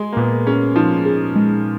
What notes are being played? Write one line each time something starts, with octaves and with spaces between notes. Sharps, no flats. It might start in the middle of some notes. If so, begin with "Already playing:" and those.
Already playing: G#3 G#4
A#3
A#2 B3
C#4 G#4
F3 D#4
G#4
G#3